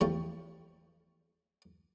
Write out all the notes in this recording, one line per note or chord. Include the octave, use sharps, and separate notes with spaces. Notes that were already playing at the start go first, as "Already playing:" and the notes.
E2 F3 G3 A3 C#6